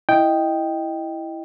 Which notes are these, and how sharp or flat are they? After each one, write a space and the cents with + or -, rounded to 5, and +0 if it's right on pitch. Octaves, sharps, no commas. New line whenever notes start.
E4 +0 D#5 +0 G5 +0